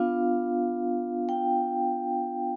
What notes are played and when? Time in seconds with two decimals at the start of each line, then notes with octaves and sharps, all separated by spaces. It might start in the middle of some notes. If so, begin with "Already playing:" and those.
Already playing: B3 D4 F4 F5
1.29 G5